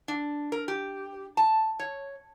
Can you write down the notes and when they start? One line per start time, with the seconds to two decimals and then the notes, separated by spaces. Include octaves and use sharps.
0.08 D4
0.52 A#4
0.68 G4
1.37 A5
1.79 C#5